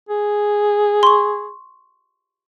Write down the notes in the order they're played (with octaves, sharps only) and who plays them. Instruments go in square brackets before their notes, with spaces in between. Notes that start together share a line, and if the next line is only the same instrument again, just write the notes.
[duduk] G#4
[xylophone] C6 C#6